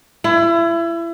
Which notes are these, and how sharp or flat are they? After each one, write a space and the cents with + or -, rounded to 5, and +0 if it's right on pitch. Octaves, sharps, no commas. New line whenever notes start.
E4 +30